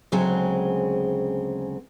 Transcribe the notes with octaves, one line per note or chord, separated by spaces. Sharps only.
D2 C#3 F#3 G#3 C4 G#5